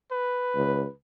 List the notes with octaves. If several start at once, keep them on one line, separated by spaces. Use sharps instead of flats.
B4
C#2